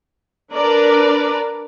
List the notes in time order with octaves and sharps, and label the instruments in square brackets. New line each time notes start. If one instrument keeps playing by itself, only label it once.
[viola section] D4 A#4 B4 D5